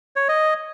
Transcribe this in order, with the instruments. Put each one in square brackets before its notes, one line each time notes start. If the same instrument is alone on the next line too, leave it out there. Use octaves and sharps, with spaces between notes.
[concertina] C#5
D#5